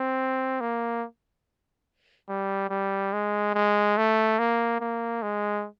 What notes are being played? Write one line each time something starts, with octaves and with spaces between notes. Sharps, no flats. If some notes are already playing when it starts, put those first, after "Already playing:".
Already playing: C4
A#3
G3
G3
G#3
G#3
A3
A#3
A#3
G#3